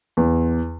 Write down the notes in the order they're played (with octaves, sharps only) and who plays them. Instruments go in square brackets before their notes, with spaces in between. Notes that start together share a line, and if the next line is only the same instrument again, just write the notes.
[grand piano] E2